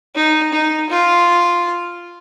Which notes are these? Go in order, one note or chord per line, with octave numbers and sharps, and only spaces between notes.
D#4
D#4
F4